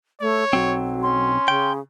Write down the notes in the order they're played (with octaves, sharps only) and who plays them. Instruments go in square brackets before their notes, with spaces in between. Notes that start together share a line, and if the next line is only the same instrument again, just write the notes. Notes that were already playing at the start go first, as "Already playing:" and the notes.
[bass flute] A3 [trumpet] C#5
[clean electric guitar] B1 C4 [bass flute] F#3
[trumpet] C#4 [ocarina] C6
[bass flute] C#3 [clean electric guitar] G5